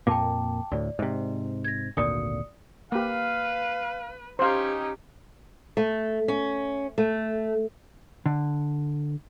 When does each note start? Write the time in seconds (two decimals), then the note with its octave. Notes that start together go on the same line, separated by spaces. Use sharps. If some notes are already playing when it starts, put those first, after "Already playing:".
0.07 F2 A#2 A#3 G5 A5 D6
0.72 D2 A2 D5
0.99 G#2 C3
1.64 G#6 A#6
1.97 G#1 D2 A#2 D5 D#6 C#7
2.92 A#3 G4 B4 F5
4.39 C#4 D#4 G4 C5 F5
5.77 A3
6.28 C#4
6.98 A3
8.26 D3